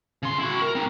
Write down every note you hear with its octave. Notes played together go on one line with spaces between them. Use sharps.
C#3 C6
E4 F#4
A#4
C4 D#4